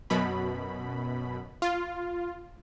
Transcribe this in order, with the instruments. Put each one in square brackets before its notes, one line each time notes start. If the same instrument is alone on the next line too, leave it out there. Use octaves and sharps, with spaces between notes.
[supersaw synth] F#2 B2 B5
F4